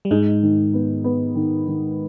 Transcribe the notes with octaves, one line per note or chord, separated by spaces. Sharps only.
G3
G#2 G#3 D#4
D#3
B3
B3
D#3
D#3